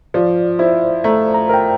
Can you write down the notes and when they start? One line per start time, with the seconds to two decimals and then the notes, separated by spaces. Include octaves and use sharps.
0.14 F3 D5
0.59 E4 C5
1.04 A3 A#5
1.34 A#5
1.49 A#4 G5